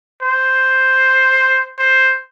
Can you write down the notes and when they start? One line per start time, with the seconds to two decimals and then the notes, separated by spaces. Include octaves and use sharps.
0.23 C5
1.78 C5